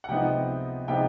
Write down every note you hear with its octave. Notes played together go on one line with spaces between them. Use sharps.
F#5
C3 F3 G#3 B3 D#4 G5
C3 F3 G#3 B3 D#4 G5